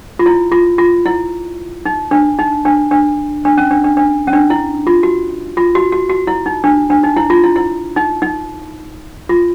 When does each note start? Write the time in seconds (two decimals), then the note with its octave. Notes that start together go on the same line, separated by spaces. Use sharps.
0.19 F4
0.26 E4
0.52 F4
0.78 F4
1.06 E4
1.85 D#4
2.11 D4
2.39 D#4
2.65 D4
2.91 D4
3.45 D4
3.58 C#4
3.71 D4
3.84 D4
3.97 D4
4.27 C#4
4.33 D4
4.50 E4
4.87 F4
5.03 F#4
5.57 F4
5.75 F#4
5.92 F#4
6.10 F#4
6.27 E4
6.46 D#4
6.64 D4
6.90 D4
7.04 D#4
7.16 E4
7.30 F4
7.43 E4
7.56 E4
7.96 D#4
8.22 D#4
9.29 F4